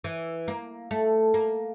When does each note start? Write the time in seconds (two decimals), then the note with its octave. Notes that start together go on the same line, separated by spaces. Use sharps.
0.04 E3
0.48 A#3
0.91 A3
1.34 A#3